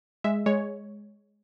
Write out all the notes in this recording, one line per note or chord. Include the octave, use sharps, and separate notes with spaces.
G#3 E5
G#3 C#5